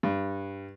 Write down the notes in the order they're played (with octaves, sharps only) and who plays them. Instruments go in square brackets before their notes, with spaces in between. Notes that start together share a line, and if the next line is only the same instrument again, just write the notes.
[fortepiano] G2